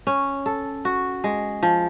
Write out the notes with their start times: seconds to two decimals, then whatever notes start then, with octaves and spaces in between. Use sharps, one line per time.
0.07 C#4
0.46 A4
0.85 F#4
1.24 G#3
1.63 F3